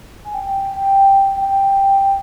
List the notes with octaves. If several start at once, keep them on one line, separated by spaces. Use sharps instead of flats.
G#5
G5
G5